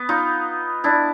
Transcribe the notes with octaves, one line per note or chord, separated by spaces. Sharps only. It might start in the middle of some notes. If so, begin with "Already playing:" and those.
Already playing: B3
D#4 F4
D4 E4